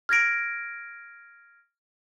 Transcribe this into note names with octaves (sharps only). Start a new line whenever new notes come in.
F6 G#6 A#6 D7